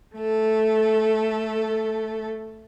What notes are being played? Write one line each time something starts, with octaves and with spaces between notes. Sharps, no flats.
A3 A4